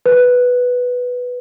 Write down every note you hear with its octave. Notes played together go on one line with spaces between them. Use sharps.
B4